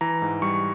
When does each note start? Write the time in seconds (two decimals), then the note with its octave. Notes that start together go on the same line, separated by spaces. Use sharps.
0.01 E3 A#5
0.22 G#2
0.42 G3 C#6